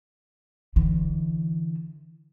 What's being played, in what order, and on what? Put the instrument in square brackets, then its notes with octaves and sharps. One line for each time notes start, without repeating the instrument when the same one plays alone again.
[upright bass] D3 E3